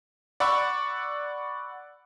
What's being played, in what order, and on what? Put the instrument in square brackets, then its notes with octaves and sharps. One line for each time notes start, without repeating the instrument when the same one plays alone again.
[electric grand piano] D5 F#5 B5 C#6 E6